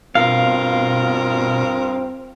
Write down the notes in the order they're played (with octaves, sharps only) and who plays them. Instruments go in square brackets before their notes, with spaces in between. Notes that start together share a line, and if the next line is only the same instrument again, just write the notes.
[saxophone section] G2 F4 A#4 [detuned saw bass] B2 [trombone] C4 [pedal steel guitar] F5